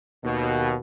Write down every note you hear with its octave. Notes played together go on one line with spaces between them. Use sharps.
D#2 B2